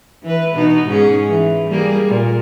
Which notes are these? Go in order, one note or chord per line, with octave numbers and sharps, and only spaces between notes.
E3 B4
B2 D#4
G#2 C#4 G#4
E3
G3 A#3 G#4
A#2